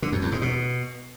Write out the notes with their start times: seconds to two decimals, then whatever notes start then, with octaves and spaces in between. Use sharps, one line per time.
0.02 D3
0.12 F2
0.22 E2
0.32 G#2
0.42 B2